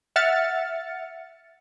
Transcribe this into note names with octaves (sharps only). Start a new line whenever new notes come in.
E5 F#5 F6 A6 C#7